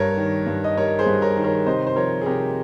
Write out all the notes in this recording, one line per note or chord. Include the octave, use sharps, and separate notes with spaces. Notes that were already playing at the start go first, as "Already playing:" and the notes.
Already playing: G2 A#4 C#5
D#3
G2
D#5
G3 A#4 C#5
G#4 C5
G2
A#4 C#5
D#3
A#4 C#5
C3 C5 D#5
C5
F3 A#4 C#5
G#4
C3 G4 A#4